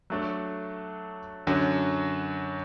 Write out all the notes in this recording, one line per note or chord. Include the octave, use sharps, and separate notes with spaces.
F#3 A3 D4 A4
F#2 D3 F#3